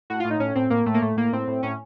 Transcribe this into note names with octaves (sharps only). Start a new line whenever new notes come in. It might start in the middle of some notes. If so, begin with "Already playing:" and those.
A2 F#4
F4
A2
D#4
A2 C#4
A2 C4
A2 A#3
A2 A3
A#3
A2 A3
A2 A#3
A2 C4
A2
A2 C#4